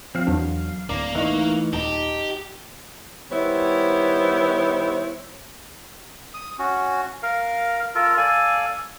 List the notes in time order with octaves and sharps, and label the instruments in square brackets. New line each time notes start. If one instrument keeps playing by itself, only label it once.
[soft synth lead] F3 [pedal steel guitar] C4 F5
[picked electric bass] E2 D4 [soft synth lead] F#3 [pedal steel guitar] F5
[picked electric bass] D1 [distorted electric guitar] A#3 [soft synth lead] D5
[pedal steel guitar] E3 A3 C#6 [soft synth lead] D#4
[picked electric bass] D#1 [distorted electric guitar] G4 [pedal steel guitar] D#5 A5 A#5
[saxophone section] D#3 G3 B3 E4 C5 C#5
[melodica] D#6
C#4 F#4
A#4 F5
F4 A4 A#4
A4 D5 F5 G#5